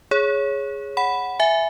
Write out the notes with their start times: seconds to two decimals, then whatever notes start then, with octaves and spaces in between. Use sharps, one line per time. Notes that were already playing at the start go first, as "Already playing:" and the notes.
0.11 G#4 C#5
0.97 F#5 B5
1.39 E5 G#5